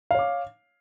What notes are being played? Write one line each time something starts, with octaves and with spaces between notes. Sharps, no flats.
C#5 F5 D6